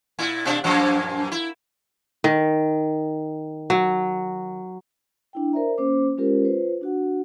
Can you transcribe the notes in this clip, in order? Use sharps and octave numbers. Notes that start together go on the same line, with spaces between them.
A#2 E4
B2 D4
F#2 A#2 F3
E4
D#3
F#3
D4 E4 G5
A#4 C5 D5 E5 A#5
A#3 C#4 C5 D6
G#3 C#4 F4 G4 A#4 C5
F4 B4 C5
D4 F#4 F#5